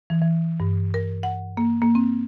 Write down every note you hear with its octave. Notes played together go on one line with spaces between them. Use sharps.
E3
E3
G2
A#4
F#5
A#3
A#3
C4